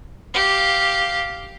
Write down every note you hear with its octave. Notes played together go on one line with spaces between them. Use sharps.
G4 F5